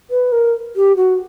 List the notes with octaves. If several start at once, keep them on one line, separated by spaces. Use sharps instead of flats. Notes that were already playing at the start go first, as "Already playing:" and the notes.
B4
A#4
G4
F#4